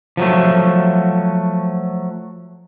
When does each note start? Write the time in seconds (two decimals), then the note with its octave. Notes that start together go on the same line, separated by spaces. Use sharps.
0.17 F3 F#3 A3